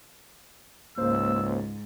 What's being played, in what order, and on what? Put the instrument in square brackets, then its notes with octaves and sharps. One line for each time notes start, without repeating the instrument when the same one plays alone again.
[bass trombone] C#2 [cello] G#2 [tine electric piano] A#3 C5 [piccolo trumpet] E6